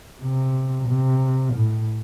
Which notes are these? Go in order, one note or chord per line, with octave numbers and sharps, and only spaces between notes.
C3
C3
A2